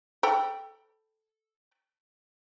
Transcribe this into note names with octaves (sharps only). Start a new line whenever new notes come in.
A4 G5 B5